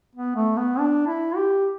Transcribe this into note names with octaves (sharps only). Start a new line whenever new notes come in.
B3
A3
B3
D4
E4
G4